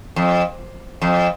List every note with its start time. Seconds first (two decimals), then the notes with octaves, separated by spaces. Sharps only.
0.16 F2
1.02 F2